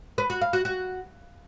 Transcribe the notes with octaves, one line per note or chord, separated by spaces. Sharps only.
B4
F#4
F5
F#4
F#4